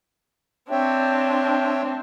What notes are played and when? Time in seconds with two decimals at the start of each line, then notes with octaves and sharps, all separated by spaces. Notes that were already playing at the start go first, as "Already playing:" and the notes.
0.71 C4 D4 C#5 E5 G5